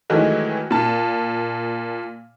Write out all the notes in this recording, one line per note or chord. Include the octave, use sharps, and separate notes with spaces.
D#3 E3 F#3 G#3 A3
A#2 A5